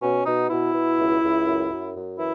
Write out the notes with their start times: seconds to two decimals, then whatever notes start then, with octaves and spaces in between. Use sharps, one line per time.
0.02 B2 C#4
0.26 B2 D#4
0.50 B2 E4
0.75 B2
0.98 C#2
1.22 C#2
1.47 F#2
1.71 F#2
1.95 F#2
2.19 E3 E4